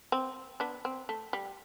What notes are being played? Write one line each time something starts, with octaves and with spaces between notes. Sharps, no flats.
C4
B3 D4
C4
A3
G3